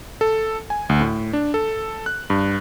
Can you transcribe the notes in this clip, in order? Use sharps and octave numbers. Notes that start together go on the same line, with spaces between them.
A4
G#5
D2
A2
D4
A4
F#6
G2